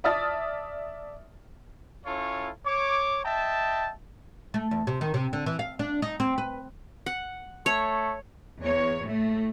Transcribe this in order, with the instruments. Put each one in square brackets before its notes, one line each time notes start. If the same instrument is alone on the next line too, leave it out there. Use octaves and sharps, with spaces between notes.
[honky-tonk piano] D5 E5 A5 D#6 F6 A6
[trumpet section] C#4 E4 F4 A4 C#5
C#5 D6
D#5 E5 G5 A5
[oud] A3
E2
C3
D#3
C3
D3
E3
F5
D4
D#4
C4
B4
[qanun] F#5
[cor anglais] A3 [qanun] C#5
[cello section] E2 C#5
A2 A3